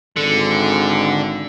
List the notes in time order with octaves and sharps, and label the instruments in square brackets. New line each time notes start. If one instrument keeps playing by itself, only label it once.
[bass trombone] G#1 [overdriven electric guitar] D3